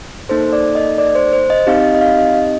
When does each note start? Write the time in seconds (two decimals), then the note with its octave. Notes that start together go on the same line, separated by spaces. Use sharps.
0.29 A#3 D#4 A4 C5
0.53 D5
0.75 D#5
0.98 D5
1.15 C5
1.33 C5
1.50 D#5
1.67 C4 D#4 G4 F5
1.83 D#5
1.95 D#5
2.01 F5
2.18 D#5
2.35 D#5